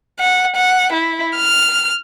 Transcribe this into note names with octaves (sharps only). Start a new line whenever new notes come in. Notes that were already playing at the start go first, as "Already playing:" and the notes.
F#5
F#5
E4
F6